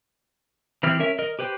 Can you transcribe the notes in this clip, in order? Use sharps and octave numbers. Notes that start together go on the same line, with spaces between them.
E3 C4 E4 G4 F6
C#4 A#4 E5
A#4 D#5
G4 B4 C5 G5